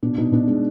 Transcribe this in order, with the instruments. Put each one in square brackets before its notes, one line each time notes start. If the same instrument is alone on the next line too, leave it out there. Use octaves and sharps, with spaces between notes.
[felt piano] B2 D4
B2 D#4
B2 D4
G#3 D4